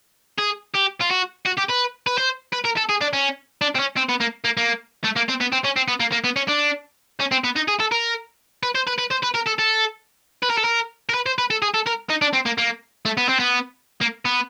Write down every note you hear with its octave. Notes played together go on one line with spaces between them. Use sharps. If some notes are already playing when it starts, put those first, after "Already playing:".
G#4
G4
F4
F#4
F#4
G4
B4
B4
C5
B4
A#4
A4
G#4
D4
C#4
D4
C4
C#4
C4
B3
A#3
A#3
A#3
A3
A#3
C4
B3
C4
C#4
C4
B3
A#3
A#3
B3
C#4
D4
C#4
C4
B3
D#4
G#4
A4
A#4
B4
C5
B4
B4
C5
B4
A#4
A4
A4
B4
A#4
A4
A#4
A#4
B4
C5
B4
A4
G#4
A4
A#4
D#4
D4
C4
A#3
A#3
A3
B3
C4
B3
A#3
B3